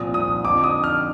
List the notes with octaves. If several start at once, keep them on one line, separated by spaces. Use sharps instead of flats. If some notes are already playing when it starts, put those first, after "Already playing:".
Already playing: C2 A#2 F3 D#6
D#6
F2 D3 F3 D6
D#6
F6